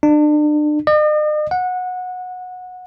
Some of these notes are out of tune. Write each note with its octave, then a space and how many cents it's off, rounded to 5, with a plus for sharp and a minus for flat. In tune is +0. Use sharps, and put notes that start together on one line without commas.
D4 +35
D#5 -45
F#5 -20